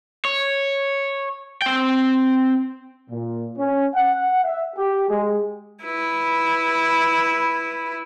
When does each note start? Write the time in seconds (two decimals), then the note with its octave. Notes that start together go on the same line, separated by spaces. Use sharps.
0.25 C#5
1.62 C4 G5
3.11 A#2
3.57 C#4
3.94 F#5
4.45 E5
4.76 G4
5.09 G#3
5.84 E4 B4